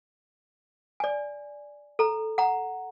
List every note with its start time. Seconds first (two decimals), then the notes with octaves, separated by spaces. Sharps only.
1.00 D5 G#5
1.99 A4 A#5
2.38 F#5 A#5